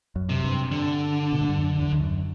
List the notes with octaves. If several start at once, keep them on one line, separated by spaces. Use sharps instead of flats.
F#2
C3
G2
D3
B2
A2
G2
F#2
E2
E2
F#2